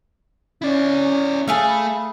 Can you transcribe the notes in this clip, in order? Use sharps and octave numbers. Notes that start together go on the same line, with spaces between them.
C#4 E4 D5
A3 G#4 A4 E5 F5
B5